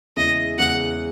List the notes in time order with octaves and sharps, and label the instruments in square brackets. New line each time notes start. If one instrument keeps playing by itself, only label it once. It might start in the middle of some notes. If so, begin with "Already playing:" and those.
[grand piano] E2 C#3 G#3 C#4 E4 [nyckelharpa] D#5
[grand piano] E2 C#3 G#3 C#4 E4 [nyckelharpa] F#5